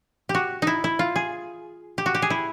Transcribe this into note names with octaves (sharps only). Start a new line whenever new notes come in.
G4
F#4
D#4 E4
E4
F4
G#4
G4
F#4
G4
G#4
E4